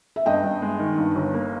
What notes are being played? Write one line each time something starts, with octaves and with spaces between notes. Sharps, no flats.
E5
G2 D#5 G5
G2
G#3
D#3
G2
G1
A#3